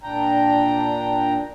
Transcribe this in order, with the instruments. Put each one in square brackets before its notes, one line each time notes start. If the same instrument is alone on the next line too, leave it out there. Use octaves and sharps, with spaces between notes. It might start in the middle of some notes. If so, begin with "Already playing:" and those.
[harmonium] A#2 D4 G5 A#5